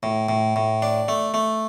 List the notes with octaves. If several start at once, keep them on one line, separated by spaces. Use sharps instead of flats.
A2
A2
A2
D4
A3
A3